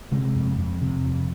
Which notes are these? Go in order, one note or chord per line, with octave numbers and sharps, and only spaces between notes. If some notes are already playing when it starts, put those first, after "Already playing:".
C3 G#3
F2
F2
C3
F2